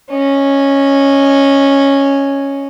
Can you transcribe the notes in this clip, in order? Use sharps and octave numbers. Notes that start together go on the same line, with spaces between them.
C#4 D#5